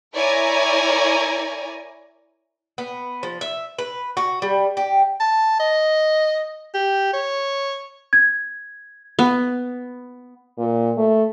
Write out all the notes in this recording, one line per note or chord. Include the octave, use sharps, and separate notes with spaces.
E4 A#4 C#5 D5 G#5 A#5
B3
F3
E5
B4
F#4
G3
G4
A5
D#5
G4
C#5
G#6
B3
A#2
A3